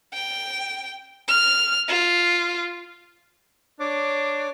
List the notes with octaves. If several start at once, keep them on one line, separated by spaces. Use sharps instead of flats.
G5
F6
F4
D4 C#5 D6